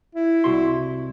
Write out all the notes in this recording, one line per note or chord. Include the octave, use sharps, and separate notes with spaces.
E4
C2 F#4 C6